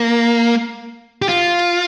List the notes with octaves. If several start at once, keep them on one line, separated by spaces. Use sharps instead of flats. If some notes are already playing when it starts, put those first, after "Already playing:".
Already playing: A#3
G4
F4